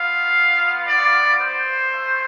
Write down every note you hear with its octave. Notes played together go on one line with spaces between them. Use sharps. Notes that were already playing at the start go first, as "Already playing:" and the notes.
Already playing: B3 F4 F5
D5
C5
A3 E4